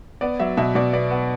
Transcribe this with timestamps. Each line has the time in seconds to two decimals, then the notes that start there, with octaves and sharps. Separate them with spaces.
0.21 B3 D5
0.40 F#3 E5
0.57 B2 E5
0.75 B2 D5
0.93 B3 D5
1.11 B3